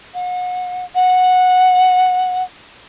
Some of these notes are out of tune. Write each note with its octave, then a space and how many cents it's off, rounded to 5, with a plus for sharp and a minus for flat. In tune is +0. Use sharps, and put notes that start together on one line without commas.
F#5 -35
F#5 -10